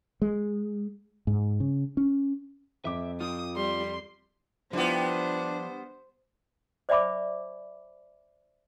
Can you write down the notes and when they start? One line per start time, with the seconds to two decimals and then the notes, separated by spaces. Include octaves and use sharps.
0.22 G#3
1.27 G#2
1.60 C#3
1.97 C#4
2.85 F2 E5 D6
3.20 C4 F4 D#6
3.56 G3 C6
4.73 F3 G3 B3 D4 E4 F4 C5
6.89 C5 D5 E5 G#5 B5 D6